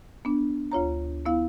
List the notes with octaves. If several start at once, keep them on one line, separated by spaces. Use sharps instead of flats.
B3 D4
D2 F4 C#5 A#5
B3 E4 F5